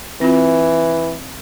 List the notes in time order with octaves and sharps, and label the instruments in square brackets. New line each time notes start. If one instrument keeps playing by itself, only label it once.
[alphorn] E3 [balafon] C4 F4